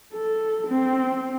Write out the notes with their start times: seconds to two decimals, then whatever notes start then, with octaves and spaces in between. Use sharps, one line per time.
0.13 A4
0.67 C4